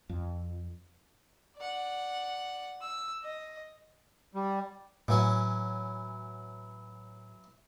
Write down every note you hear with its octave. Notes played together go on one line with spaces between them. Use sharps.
F2
D5 F#5
E6
D#5
G3
A2 E3 F#3 C#4